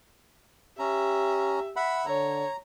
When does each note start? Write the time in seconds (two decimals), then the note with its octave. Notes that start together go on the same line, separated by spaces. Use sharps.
0.79 C#4 G4 E5 A#5
1.76 E5 F#5 B5
2.06 D3 C#5 A#5